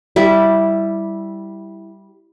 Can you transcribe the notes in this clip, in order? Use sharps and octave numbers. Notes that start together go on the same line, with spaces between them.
G3 E4